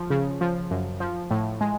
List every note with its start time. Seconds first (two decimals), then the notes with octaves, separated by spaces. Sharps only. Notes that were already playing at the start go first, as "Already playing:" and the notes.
Already playing: F3
0.10 C#3
0.41 F3
0.71 F#2
1.00 F3
1.30 A2
1.61 G#3